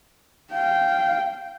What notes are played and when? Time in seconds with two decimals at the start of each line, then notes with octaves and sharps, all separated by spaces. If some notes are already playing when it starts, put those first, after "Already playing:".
0.52 F5 G5